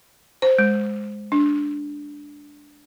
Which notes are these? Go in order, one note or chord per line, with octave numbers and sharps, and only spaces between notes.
C5
G#3
D4